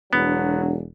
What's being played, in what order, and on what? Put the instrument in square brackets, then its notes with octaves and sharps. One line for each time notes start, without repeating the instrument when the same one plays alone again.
[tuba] E1 [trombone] F#3 [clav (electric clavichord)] B3 [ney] D4